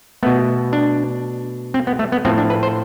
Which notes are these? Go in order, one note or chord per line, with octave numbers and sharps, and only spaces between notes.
B2 A3 B3
D4
C4
B3
A3
B3
A2 F3 A3 C4
D4
B4
C5